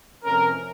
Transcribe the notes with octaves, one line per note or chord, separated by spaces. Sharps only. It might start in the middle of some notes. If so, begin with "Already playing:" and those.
F2 C3 E3 A3 C#4 A#4